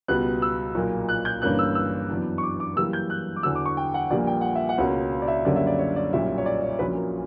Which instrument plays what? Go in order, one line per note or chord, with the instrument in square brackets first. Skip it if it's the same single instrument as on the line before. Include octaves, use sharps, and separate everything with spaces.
[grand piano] C#2 B2 G3 B3 F#6
E6
B1 A#2 A#3
F#6
G6
G1 G2 E3 A#3 C#4 F#6
E6
E6
F#2 E3 B3 D4
C#6
D6
D6
F#2 E3 G3 A#3 E6
G6
F#6
D6
E2 D3 F#3 E6
D6
C#6
G5
F#5
A#1 A#2 G3 A#3 D5
G5
F#5
E5
F#5
C#2 B2 A#3 C#4
D5
E5
F#2 D3 G3 A#3 C#4 D5
E5
D5
C#5
D5
B1 A#2 G3 C#4 E5
C#5
D5
C#5
A#1 A#2 F#3 C#4 B4
A#4